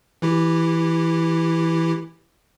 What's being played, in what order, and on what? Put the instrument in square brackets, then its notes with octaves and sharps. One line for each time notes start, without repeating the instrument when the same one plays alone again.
[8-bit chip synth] E3 E4 G4